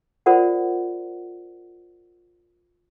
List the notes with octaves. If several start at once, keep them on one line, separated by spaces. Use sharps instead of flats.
F4 A#4 C5 D5 F#5